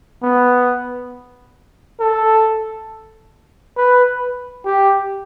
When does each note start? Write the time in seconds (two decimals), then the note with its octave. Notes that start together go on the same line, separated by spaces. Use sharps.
0.23 B3
2.00 A4
3.77 B4
4.65 G4